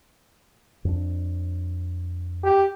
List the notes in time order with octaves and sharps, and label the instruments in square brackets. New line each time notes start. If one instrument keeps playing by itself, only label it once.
[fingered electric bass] F2 D4
[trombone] G4